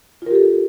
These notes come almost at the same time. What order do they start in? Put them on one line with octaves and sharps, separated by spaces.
F4 A#4 G4 A4